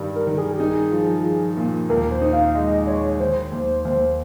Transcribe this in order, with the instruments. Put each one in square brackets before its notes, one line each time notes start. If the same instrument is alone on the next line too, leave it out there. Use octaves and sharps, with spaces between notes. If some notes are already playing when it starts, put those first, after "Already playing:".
Already playing: [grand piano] G2 D#3 G3
[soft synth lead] A#4
[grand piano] D#3
[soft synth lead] G#4
G4
[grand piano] D#4 [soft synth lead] G#4
[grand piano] F3
F3
A#2
[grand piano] D#2 [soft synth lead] A#4
[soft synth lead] C5
[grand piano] D#4
[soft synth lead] F5
[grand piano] G#3 [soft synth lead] D#5
[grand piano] G#3 [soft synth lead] C#5
[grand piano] D#3 [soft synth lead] C5
[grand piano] D#2
D#2